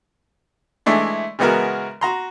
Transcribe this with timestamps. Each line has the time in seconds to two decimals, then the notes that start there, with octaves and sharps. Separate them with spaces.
0.86 E3 G#3 A3 D4 E4
1.39 C#3 E3 G#3 B3 F#4 A#4
2.01 F#4 A#5 C6